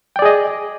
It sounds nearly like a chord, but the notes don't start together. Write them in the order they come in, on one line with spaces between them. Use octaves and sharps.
G5 D5 G#4 D#5